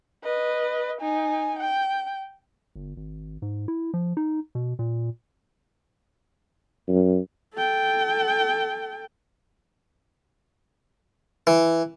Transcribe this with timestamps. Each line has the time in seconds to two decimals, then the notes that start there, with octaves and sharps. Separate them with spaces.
0.24 B4 D#5
1.01 D#4 G#5
1.59 G5
2.76 G1
2.97 G#1
3.42 G#2
3.68 E4
3.94 F3
4.17 D#4
4.55 B2
4.79 A#2
6.88 F#2
7.54 A4 G5
11.47 E3